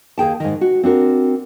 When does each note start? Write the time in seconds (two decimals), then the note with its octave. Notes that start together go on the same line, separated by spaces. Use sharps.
0.18 D#2 G#4 G5 A5
0.40 G#2 D#3
0.61 F#4
0.83 C4 D4 F#4 A#4